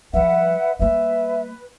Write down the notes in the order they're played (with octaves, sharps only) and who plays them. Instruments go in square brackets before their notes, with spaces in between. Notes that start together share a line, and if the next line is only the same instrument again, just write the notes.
[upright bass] F3 G3 [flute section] B4 F#5 [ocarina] E5
[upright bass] G3 A#3 [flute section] B4 [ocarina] E5